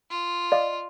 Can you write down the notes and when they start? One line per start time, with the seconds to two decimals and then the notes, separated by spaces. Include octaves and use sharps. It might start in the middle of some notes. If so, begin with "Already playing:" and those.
0.10 F4
0.52 D5 D#5 F5